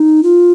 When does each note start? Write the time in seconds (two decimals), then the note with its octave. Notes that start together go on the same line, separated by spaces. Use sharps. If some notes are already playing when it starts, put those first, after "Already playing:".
Already playing: D#4
0.23 F4